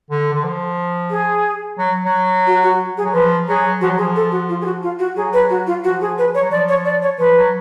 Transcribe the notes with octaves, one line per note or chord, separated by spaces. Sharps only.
D3
D3
F3
G#4
F#3
F#3
F#4
F#4
G#4
F#3
F3 B4
F#3 G#4
F3 F#4
F#3
F3 G#4
A4
F#4
F4
G#4
F#4
F4
F#4
F#3 G#4
B4
F#4
F4
F3 F#4
G#4
B4
C#5
F#3
F3 D5
C#5
D5
C#5
F3 B4
F#3